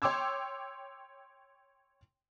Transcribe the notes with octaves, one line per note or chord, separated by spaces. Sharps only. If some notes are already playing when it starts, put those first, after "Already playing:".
C#5 G5 C6 D6 E6 G#6